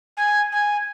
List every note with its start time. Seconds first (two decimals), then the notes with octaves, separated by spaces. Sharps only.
0.17 G#5
0.52 G#5